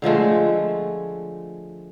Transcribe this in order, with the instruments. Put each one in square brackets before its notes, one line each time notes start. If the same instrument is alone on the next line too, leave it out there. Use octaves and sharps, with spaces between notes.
[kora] D3 F3 G#3 A3